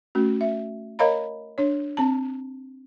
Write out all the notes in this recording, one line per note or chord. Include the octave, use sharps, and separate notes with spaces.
A3 C#4 F#4
E5
A#4 C#5 D#5 F5 A#5 B5
D4 C#5
C4 A5